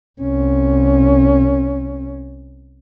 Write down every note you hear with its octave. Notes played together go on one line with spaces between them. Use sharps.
C2 C#4